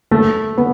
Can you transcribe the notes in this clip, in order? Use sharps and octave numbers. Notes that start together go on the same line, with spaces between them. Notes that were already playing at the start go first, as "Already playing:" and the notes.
A3
B3